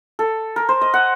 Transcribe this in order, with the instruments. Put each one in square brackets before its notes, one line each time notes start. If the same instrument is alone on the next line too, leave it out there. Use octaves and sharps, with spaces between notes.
[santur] A4
A#4
C5
D#5
F#5